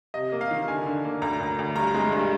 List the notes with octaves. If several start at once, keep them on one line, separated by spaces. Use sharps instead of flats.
C3 D#5
A#3
F5
D#3
D3 G#5
D3
A#3
D2 A#5
D2
D2
G2 A#5
G#3
G2